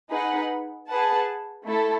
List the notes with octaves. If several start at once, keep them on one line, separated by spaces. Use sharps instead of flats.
D#4 G#4 B4 F#5
G#4 B4 F#5 A5
A3 E4 A4